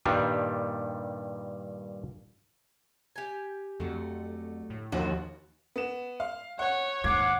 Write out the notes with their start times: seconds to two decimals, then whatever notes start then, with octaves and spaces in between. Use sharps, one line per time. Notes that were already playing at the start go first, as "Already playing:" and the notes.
0.05 G2 A#2 D#3 G3 D4
3.16 G4 G#5
3.80 F2 D3 F#3 A3
4.70 A2
4.92 D#2 F3 F4 F#4
5.76 B3 E7
6.20 F5
6.59 C#5 F#5 F#6
7.04 D#2 G#2 F5 F#5 D6 G#6